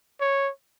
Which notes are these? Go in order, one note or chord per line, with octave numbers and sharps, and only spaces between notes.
C#5